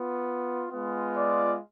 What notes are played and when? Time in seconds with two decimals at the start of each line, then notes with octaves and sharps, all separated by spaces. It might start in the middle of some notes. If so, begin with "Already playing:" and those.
Already playing: B3 F4
0.71 G#3 B3 F4
1.15 D5